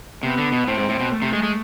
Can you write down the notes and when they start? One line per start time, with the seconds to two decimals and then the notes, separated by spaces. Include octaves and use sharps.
0.23 C3 B3
0.38 D3
0.52 B2
0.67 A2 C4
0.78 G#2
0.89 A2
1.00 B2
1.11 A3
1.22 C3
1.33 G#3
1.43 G#3